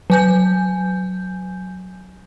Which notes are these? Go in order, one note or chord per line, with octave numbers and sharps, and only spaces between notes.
F#3 G#5 G6